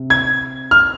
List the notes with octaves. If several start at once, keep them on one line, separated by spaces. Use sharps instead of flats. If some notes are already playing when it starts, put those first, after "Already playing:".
Already playing: C3
G#6
F6